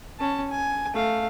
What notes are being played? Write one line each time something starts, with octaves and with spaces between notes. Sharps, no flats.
C#4 A5
G#5
A3 F5